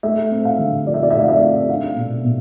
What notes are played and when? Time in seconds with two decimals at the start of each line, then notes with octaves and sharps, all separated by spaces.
0.03 A3 E5
0.32 C4
0.45 F5
0.59 D3
0.87 F3 D5
0.94 E5
1.03 D5
1.11 A3 E5
1.19 D5
1.24 F5
1.28 E5
1.42 C4
1.69 D4 F5
1.96 B2
2.24 B2